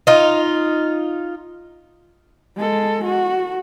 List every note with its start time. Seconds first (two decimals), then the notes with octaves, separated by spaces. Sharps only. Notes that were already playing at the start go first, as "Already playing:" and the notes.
0.07 D#4 F4
2.56 G#3 A4
3.04 F#4